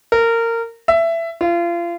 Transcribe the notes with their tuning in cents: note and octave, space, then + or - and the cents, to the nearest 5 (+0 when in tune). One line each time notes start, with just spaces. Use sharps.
A#4 -20
E5 +15
F4 -30